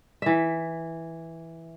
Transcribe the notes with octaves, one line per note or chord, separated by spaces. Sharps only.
E3 E5